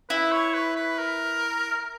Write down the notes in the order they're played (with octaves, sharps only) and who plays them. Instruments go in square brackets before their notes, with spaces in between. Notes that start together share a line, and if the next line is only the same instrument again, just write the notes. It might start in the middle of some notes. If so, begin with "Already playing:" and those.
[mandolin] E4 [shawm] B4
[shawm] C#5
B4
B4
A#4